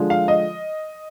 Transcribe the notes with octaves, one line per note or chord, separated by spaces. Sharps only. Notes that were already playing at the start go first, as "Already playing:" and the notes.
Already playing: D3 F3 G#3 D4
F5
D#5